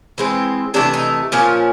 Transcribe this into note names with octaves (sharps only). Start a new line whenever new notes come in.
E3 G#3 C4
C3 E3 A3 D4
D#4
A#2 F3 A#3 C#4